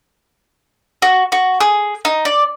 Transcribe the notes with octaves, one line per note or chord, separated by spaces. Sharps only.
F#4
F#4
G#4
D#4
D5